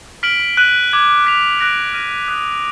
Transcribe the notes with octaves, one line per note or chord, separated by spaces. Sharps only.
F6 B6 D7 F#7
F#6 B6 D#7 F#7
D6 G#6 D#7 F#7
F#6 B6 F7
F#6 A#6 D7
F6 A#6 D#7
D#6 F#6 B6